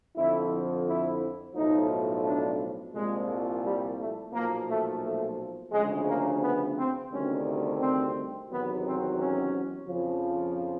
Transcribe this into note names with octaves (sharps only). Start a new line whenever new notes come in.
F2 D3 F3 E4
E4
B1 A2 F3 D#4
D4
C2 A#2 F3 G#3
G3
A3
B1 A#2 F3 A#3
A3
A3
D2 C#3 F3 G#3
A#3
B3
C4
D2 C3 D#3 G3 C#4
C4
E2 C3 D#3 F#3 B3
C4
C#4
F2 C#3 F3